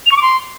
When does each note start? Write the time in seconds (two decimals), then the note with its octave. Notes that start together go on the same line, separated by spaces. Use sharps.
0.06 F7
0.11 C#6
0.17 D6
0.22 C6